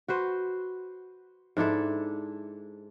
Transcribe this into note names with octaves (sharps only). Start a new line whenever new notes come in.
F#4 B4 C5
G#2 D4 E4 A4